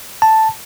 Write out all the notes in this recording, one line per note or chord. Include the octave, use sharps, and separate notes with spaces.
A5